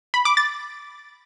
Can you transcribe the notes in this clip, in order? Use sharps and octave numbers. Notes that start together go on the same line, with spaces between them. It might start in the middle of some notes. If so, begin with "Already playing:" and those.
B5
D6
A6